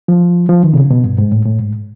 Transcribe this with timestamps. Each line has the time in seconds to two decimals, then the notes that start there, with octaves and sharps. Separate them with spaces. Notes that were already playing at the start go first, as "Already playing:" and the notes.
0.08 F3
0.49 F3
0.64 D#3
0.73 C3
0.77 C#3
0.90 B2
1.04 G2
1.18 G#2
1.32 A2
1.45 A2
1.59 G#2